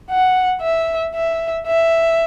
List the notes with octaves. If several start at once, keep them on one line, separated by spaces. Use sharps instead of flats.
F#5
E5
E5
E5